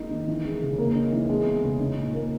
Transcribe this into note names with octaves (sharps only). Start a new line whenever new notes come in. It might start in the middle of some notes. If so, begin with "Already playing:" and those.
Already playing: G#3 A#3 D#4
D#3
E3
G#3
C#3
A#3
D#4
E3
G#3
B3
C#3
D#4
A#2
A#3